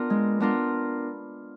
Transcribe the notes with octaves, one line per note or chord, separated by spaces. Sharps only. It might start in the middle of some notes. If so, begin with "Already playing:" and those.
Already playing: B3 D4 F4 A#4
G#3
B3 D4 F4 A#4